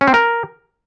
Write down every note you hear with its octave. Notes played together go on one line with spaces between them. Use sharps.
C#4
C4
A#4